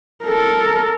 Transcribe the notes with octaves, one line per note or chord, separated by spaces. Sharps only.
A4 A#4